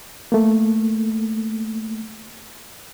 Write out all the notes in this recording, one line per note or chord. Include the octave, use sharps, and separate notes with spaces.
A3 A#3